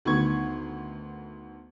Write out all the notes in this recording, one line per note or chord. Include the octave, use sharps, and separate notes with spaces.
D2 D#3 B3 C#6 G#6